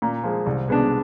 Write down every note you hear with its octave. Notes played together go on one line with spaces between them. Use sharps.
A#2
F3 G#3
C2
B2 G#3 B3 D4